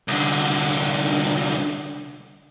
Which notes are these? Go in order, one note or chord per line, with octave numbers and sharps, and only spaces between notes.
C2 D3